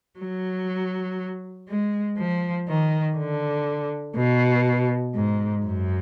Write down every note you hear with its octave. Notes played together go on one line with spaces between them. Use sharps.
F#3
G#3
F3
D#3
D3
B2
G#2
F#2